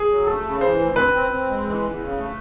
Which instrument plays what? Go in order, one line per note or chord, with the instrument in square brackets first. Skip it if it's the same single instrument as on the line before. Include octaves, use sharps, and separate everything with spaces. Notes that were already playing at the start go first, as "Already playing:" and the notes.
Already playing: [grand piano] G#4
[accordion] F#3
[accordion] A3 [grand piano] A4
[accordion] C#3
[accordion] E3 [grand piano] C5
[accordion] D2
[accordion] C4 [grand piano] B4
[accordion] C4
C4
G#3
E3
E2
C#3
A3